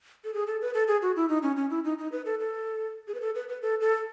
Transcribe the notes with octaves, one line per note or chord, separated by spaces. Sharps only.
A4
G#4
A4
B4
A4
G#4
F#4
E4
D#4
C#4
C#4
E4
D#4
D#4
B4
A4
A4
G#4
B4
A4
B4
B4
A4
A4